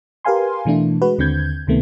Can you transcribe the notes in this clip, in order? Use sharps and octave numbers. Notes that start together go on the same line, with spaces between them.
G4 A#4 B4 F5 G#5 C6
B2 E3 A3 D4 E4
G#3 F#4 B4
D#2 D3 C4 G6 G#6
C#2 C3 D#3 A3 B3